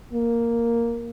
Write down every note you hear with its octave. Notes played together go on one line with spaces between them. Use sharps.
A#3